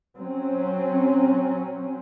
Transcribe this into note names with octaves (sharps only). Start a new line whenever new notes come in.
F#3 C4 C#4